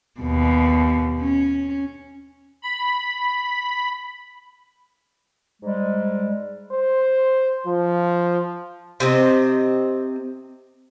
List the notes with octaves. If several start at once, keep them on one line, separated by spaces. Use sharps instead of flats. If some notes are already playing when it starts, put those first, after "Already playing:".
D#2 B2
C#4
B5
G#2 G3 G#3
C5
F3
C3 C4 D#5